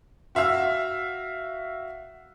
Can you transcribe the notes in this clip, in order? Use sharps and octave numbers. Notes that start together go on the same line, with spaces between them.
F#4 E5 F5 E6